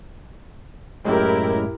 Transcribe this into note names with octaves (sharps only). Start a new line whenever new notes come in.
F#2 A2 G#3 E4 G4 A#4